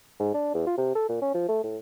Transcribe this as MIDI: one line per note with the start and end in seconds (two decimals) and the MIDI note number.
0.19 0.32 44
0.34 0.52 62
0.54 0.66 40
0.66 0.76 65
0.78 0.92 48
0.95 1.08 69
1.09 1.21 46
1.21 1.31 61
1.34 1.44 53
1.48 1.61 57
1.64 1.78 45